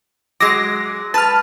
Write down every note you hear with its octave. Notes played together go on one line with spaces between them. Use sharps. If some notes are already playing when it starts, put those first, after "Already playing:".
F#3 G#3 D6 A#6
B4 A5 F6